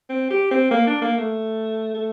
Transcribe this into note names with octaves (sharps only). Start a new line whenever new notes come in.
C4
G4
C4
A#3
D4
A#3
A3
A3